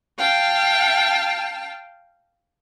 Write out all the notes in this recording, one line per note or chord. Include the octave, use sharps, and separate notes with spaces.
F5 G5 A5